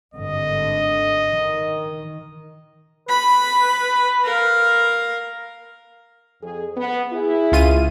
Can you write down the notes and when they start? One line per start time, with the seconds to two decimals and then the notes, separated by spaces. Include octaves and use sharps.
0.14 G#1 G2 D3 D#5
1.31 D#3
3.09 B4 B5
4.24 A#4 F5
6.41 F2 G#4
6.76 B3
7.12 E4 G#4
7.52 C#2 F4 D#7